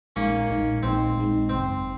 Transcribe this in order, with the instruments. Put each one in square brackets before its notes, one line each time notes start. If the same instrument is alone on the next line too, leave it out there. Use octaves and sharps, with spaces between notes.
[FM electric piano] A#1 A#2 G#3 D#4 [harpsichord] A#3 C#4
[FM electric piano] A#1 A#2 G#3 D#4
[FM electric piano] A#1 A#2 G#3 D#4 [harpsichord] C4
[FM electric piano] A#1 A#2 G#3 D#4
[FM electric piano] G#1 F#2 C#3 [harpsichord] C4